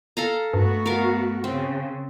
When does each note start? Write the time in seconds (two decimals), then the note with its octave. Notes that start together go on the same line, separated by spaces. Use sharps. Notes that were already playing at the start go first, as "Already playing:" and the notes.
0.17 A4 F5 A#5
0.54 G2 A3 B3 F#4
0.86 A#4 F5
1.44 C#3 C4